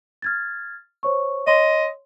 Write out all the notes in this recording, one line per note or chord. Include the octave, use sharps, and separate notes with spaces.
F6 G#6 A6
C5 C#5 C#6
C#5 D#5 C6